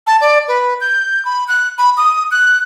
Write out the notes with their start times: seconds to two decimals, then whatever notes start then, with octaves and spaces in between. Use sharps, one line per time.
0.07 A5
0.21 D5
0.48 B4
0.81 G6
1.25 B5
1.48 F#6
1.78 B5
1.97 D#6
2.31 F#6